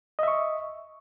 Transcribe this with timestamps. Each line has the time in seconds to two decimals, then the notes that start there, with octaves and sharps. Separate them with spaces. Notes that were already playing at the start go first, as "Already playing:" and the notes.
0.19 D#5
0.23 E5
0.28 C#6